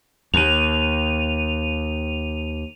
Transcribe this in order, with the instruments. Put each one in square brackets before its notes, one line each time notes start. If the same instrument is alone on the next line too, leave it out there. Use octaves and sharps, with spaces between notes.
[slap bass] D#2 [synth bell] D#7 F7